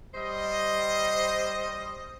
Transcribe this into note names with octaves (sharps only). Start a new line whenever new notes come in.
G3 C5 D#5